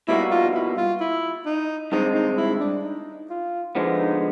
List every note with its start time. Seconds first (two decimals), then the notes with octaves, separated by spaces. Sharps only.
0.08 B2 G3 A#3 D#4 E4 F#4
0.31 F4
0.54 E4
0.77 F4
1.00 E4
1.46 D#4
1.92 G2 D#3 G#3 C4 D#4
2.15 D#4
2.37 E4
2.60 D4
2.83 D#4
3.30 F4
3.75 D3 F3 G#3 B3 E4
3.98 D#4